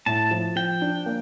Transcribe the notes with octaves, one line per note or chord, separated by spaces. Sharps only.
A2 A5
F3
F3 G5
D4
A#3